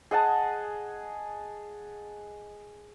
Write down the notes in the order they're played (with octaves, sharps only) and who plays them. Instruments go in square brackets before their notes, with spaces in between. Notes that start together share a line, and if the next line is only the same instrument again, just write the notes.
[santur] G#4 D#5 F#5 A5